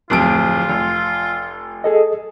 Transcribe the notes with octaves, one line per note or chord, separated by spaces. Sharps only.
D1 F2 F4 D7
F1
G#4 A4 D#5